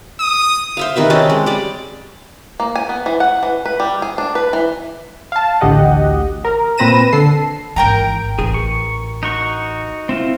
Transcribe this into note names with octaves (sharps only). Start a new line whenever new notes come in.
D#6
C5 E5 F5
C3 D#3 B4 E5
C4 C#4 D#5 A5
G#3
G3 D5
A#3
G#5
B3
E3
F#5
E3
B4
G3
G#4
D4
B4
E3
F5 A5
A1 D2 G4 D#5 F#5
A#4
A#2 C4 B4 A#6 D#7 E7
D3 A4 C7
G#1 E3 A#4 G5 A#5
A1 G#4
C#6
D#4 F#4 C#6
C4 E4 F4